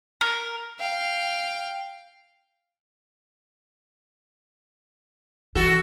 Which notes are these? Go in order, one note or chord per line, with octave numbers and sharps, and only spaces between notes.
A#4
F5 G5
E3 F#4 A4